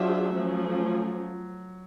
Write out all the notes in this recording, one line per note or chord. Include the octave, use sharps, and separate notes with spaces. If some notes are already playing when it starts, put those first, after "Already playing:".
Already playing: F#3 D4 F4 G#4 C5 E5
F3 A3 C#4